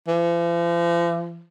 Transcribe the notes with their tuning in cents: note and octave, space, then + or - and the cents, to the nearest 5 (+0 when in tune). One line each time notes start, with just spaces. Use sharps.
F3 -45